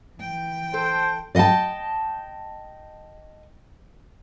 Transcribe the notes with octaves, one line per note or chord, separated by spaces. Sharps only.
E3 G5
A4 C5
D5 D#5 F#5 G5 A5